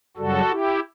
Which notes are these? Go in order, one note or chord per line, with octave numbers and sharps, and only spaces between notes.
F#2 C#3 G3 F#4 A4
E4 G4